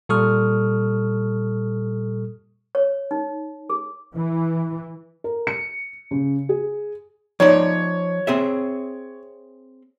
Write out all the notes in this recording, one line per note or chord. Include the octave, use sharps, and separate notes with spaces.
A#2 G3 A4 C#6 D#6 F6
C#5
D#4
G#4
E3
A#4
C#7
C#3
G#4
F3 D#4 C#5 D5
C4 G#4 E5